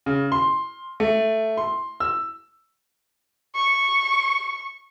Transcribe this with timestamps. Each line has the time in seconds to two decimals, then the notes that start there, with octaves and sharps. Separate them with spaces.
0.06 C#3
0.32 C6
1.00 A3
1.57 C6
2.00 E6
3.55 C#6